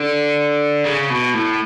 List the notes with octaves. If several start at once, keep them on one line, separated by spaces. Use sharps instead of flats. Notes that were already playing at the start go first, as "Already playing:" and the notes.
Already playing: D3
C#3
B2
A2